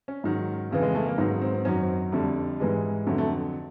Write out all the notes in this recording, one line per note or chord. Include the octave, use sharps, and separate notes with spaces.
C#4
G#2 D#3 F#3
F2 C#3 E3
G#3
A3
A#3
G#2 D#3 F#3 B3
C4
C4
F#2 D#3 F#3 C#4
C4
F2 D3 G3 A3
G#2 E3 G3 G#3
F2 D3 F#3 A3
A3